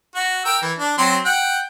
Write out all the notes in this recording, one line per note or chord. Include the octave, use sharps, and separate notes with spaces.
F#4
A#4 G5 E6
E3
D4
F#3 C4 C6
F#5 G5